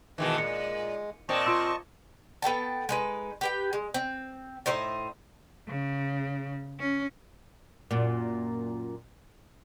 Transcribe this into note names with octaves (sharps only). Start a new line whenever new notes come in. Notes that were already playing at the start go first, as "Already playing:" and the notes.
B2 D#3 E3 G#3
A#2 C#7
A#2 C4 D#5 A5 C#6
F4 C6 E6
B3 A4 G5 A5
G#3 D#4 B4
G4 B4 G5
G#3
C4
A2 D#4 C5 E5
C#3
C#4
F#2 A#2